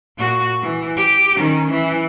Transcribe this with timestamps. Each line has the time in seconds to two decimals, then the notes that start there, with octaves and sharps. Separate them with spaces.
0.18 A#2 F#4
0.63 E3
0.97 G4
1.36 D#3 C#4
1.71 E3